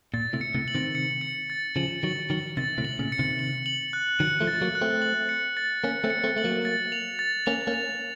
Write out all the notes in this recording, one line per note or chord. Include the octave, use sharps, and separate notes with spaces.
A#2 A6
A2 C3
C#7
A2 C3
F#7
C3 D#3
C#7
C#7
A6
C#3 F3 F#7
D#3 F#3 F#7
D#3 F#3 F#7
C3 D#3 A6
A2 C3
F#7
A#2 C#3
C#7
C3 D#3
F#7
F#7
F#6
D#3 F#3 C#7
F3 A3
A6
F#3 A#3
F#6
A3 C4
F#7
C#7
A6
A#3 C#4 C#7
A3 C4
C#7
A3 C4
A3 F#7
F#3 A#3
A6
F7
A6
A#3 C#4 F7
A#3 C#4
F7